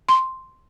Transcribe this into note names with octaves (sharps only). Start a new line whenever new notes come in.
C6